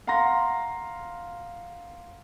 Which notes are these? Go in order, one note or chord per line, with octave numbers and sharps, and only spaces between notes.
F5 F#5 A#5 C6 A#6